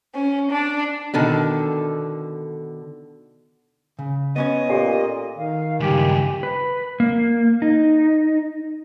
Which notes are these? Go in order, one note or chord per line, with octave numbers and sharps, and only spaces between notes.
C#4
D4
B2 D3 D#3 A4
C#3
B3 C#4 C#5 D#5
A#2 G4 A4 G#5
D#3 F5
C#2 G2 G4 G#5
B4
A#3
D#4